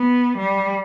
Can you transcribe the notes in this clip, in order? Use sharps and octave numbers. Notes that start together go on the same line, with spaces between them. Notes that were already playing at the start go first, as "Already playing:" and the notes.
Already playing: B3
G3